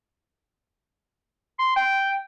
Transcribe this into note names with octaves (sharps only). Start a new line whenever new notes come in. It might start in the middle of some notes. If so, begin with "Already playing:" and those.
C6
G5